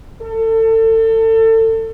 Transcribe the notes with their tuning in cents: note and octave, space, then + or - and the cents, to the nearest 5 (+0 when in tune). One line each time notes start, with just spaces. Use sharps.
A4 +30